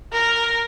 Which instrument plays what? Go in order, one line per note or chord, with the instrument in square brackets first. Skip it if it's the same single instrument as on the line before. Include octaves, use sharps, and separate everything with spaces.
[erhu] A#4